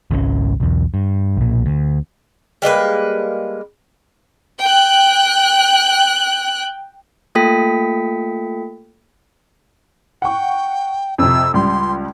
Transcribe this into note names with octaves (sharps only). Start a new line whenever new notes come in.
G#1 C#2 B2 C#4
B1 E2
G2
B1 A#2
D2
G3 G#3 A#3 B4
G5 F#6
A3 A#3 F4 A4 G5 B6
F#5 G5 C#6
F2 C3 E6
C#2 G3 C6